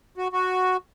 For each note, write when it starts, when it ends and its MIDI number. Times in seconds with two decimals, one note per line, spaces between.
0.18 0.28 66
0.33 0.77 66